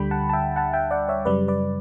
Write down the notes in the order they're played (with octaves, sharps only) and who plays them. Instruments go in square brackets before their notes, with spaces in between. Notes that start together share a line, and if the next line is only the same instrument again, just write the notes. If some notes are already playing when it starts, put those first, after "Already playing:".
Already playing: [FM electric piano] D2 D3 G3 G5 B5
F#5 A5
A5
E5 G5
F#5 A5
E5 G5
D5 F#5
C#5 E5
F#2 C#3 G3 B4 D5
B4 D5